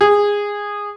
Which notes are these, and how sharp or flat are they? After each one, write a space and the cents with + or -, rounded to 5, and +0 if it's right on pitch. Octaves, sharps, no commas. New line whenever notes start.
G#4 -15